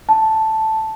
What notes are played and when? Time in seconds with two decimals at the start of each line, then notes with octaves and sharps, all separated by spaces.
0.09 A5